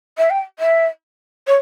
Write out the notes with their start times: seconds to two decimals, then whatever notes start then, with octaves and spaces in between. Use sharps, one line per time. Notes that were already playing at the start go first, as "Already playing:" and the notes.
0.18 E5
0.30 G5
0.59 E5
1.47 C#5